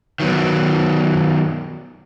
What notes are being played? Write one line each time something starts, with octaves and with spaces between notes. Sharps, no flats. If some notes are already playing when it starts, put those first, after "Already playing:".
D#3 F#3 B3